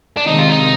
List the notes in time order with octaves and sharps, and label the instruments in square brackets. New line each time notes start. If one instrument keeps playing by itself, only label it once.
[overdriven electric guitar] D4
[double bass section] C3 D#3 G#3 C4 [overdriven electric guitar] D#4
[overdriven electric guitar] F4
D#4